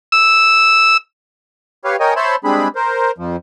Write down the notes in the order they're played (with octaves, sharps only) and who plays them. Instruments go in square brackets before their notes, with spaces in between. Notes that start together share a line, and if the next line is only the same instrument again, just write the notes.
[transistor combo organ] E6
[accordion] G4 B4 C#5 F5
A#4 C#5 D#5 G5 G#5
C5 C#5 E5 A5 B5 C6
G3 G#3 C4 D4 G#4 B5
A#4 C5
F2 F3